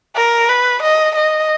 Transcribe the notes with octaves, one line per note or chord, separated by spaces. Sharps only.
A#4
B4
D#5
D#5